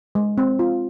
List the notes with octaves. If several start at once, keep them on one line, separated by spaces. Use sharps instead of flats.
G#3
C4
F4